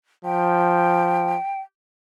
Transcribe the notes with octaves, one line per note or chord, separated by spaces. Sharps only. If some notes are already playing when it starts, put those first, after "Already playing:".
F3 G5